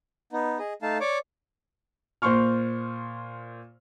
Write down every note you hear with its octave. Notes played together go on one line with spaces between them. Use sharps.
B3 D#4
G#4 D#5
A3 D#4 F5 A5
C#5 D5 D6
A#2 C5 C6 C#6 F6